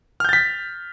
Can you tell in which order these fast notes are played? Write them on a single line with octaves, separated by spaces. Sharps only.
F6 G6 A6 B6